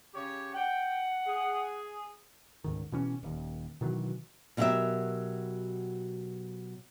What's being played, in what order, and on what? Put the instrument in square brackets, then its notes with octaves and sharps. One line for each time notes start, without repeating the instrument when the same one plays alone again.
[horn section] C#3 G4 C#5
[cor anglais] F#5 [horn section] G5
[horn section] G#4
[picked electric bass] C#2 G#2 D#3
B2 E3 C#4
D#1 D#2
B2 D#3 E3 F#3
[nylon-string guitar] B2 F#3 E4 G4 A#4 E5